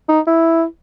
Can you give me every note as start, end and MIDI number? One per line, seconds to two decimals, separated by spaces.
0.09 0.20 63
0.27 0.64 64